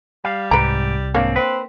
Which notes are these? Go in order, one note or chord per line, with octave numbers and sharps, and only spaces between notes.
G3 F5
C2 G#2 G4 B4 A#5
G#2 A#3 C4 D4 C#5
C4 B4